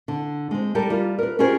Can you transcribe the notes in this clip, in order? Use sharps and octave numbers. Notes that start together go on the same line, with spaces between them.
D3
G#3 C4
G3 G4 A4 A#4
G3 F4
A#4 B4
C#4 F4 G4 G#4 A#4 C5